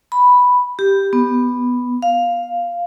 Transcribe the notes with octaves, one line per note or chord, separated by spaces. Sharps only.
B5
G4
B3
F5